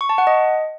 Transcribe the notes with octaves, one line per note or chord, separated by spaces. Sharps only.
C#6
A5
F#5
D#5